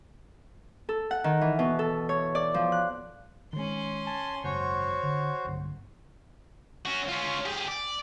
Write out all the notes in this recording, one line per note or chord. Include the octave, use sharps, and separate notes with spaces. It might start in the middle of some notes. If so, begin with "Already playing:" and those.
A4
F#5
D#3
E3
B2
A4
C#5
D5
F3
F#6
D#3 G#3 C#4 C6
G#5 A5
G#1 F#2 C#3 F#4 C5 C#5
D3
B1 G2 D3
C#4 F#4
C#4 F4
G4 G#4
D5